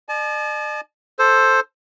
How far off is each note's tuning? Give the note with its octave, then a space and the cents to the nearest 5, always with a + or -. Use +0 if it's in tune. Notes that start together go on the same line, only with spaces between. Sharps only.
D5 +45 A5 -40
A4 +0 C5 +10